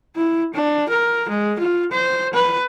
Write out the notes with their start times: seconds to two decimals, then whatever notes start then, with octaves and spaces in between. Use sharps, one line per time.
0.16 E4
0.54 D4
0.90 A#4
1.29 G#3
1.59 F4
1.92 C5
2.34 B4